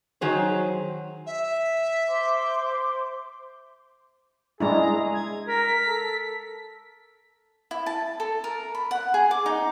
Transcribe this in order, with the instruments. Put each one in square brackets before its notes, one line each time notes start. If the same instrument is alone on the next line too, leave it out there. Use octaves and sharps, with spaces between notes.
[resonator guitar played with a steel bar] D#3 F#3 G#4 C5
[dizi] E5
[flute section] C5 C6 D6
[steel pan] G#3 D4 E4 [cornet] G#4 [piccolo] A#5
[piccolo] G#6
[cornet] A#4 [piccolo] B6
[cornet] A4
[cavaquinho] E4
A5
A4
A#4
B5
F#5
G#4
D6
D#4